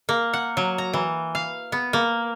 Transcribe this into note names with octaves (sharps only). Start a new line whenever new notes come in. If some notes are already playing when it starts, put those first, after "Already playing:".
A#3
F#5
F#3
A#5
E3
F5
B3
A#3